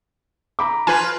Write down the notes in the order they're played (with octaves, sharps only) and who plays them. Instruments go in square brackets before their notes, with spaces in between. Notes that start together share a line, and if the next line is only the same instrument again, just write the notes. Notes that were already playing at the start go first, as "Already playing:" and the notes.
[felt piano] A#5 B5 D6
[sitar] F4 B4 [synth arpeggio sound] G#5